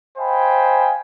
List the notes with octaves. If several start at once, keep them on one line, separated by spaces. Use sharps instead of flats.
C5 D#5 F5 G5 G#5 B5